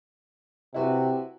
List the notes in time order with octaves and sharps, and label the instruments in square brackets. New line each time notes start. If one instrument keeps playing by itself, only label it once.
[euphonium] C3 [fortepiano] E4 F#4 B4